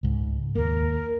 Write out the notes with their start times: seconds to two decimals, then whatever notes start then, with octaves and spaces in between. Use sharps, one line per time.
0.03 C#2 G#2
0.55 D#2 A#3 A#4